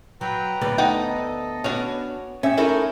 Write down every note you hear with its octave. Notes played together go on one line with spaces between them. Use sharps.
F#3 B4 G5 A#5
D2 B3 D5
D#4 A4 D#5 F#5 G5
B3 C#4 D4 F#4
C#4 G4 D#5 E5
D#4 E4 A4 A#4 C#6 F6 G6